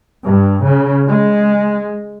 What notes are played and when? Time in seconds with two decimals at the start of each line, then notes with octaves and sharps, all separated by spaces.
0.24 G2
0.64 C#3
1.07 G#3